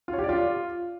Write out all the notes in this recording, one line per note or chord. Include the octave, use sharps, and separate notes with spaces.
F4
C#5
G4
D5
F4